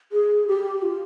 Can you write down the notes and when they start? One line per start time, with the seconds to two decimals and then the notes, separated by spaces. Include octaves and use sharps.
0.12 G#4
0.48 G4
0.82 F4